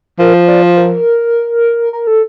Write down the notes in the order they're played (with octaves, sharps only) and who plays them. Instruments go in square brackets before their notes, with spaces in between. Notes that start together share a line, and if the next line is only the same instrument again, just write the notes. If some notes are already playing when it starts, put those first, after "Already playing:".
[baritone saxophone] F3 [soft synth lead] A#4
[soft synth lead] C5
D5
C5
A#4
A#4
A4